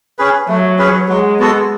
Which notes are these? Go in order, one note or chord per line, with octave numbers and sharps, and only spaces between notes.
C#4 G#4 B4
F#3 A3
C#4 G#4 B4
F#3 G#3
B3 F#4 A4